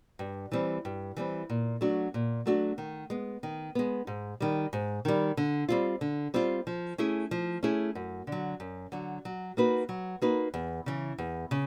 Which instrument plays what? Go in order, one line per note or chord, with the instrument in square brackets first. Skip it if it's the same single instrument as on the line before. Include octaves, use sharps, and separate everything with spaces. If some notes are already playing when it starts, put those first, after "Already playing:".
[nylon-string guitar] G2
E3 G3 C4
G2
E3 G3 C4
A#2
F#3 A3 D4 F#4
A#2
F#3 A3 D4 F#4
D#3
G#3 B3
D#3
G#3 B3
G#2
D#3 G3
G#2
D#3 G3
D3
G3 C4 F4
D3
G3 C4 F4
F3
A3 C#4 E4 G#4
F3
A3 C#4 E4 G#4
F#2
D3 F#3
F#2
D3 F#3
F#3
A#3 D#4 F#4 B4
F#3
A#3 D#4 F#4 B4
E2
C#3 E3
E2
C#3